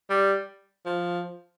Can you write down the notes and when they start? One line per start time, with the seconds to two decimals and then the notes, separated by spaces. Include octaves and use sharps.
0.10 G3
0.86 F3